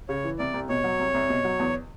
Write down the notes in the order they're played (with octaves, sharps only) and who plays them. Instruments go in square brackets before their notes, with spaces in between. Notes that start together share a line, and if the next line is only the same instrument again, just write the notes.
[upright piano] C#3 [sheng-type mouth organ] C#5
[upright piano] E3
[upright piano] C2 [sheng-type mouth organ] D5
[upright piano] C2
[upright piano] B2 [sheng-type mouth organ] C#5
[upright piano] F#3
C2
C2
B2
F#3
E2